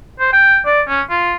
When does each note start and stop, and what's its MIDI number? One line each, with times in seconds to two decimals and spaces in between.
0.20 0.31 72
0.33 0.60 79
0.66 0.81 74
0.88 1.02 61
1.10 1.36 65